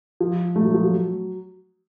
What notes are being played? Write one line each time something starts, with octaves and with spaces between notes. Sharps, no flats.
F3
A3
F#3
F3
F#3